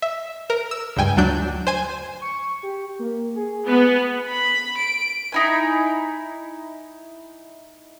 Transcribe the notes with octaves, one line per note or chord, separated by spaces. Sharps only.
E5
A#4
E6
C#2 G2 G5 G#5
D2 F#3 D4 G6
C5 G#5 D#7
C#6
G4
A#3
G#4
B3
B5
D7
D#4 E4 G#5